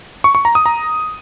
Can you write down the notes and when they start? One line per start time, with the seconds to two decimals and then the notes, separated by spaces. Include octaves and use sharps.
0.24 C#6
0.35 C#6
0.45 A#5
0.55 D#6
0.66 A#5